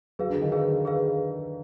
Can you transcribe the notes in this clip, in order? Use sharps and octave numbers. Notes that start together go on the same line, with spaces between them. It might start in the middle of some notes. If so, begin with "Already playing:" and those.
F#3 G#4 B4 F5
D3
D#3
G#4 B4 F5
G#4 B4 F5